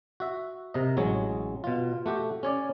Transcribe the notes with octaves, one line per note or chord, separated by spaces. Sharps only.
F#4 E5
C3 A#4 D#5
A1 F#3 G#3 C#5
B2 F4
A3 F#4 G4
C#4 C#5 D5